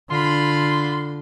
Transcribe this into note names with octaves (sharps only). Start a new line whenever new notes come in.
D3 F4 B5 C6